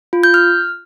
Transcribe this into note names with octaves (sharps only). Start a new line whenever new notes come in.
F4
G6
F6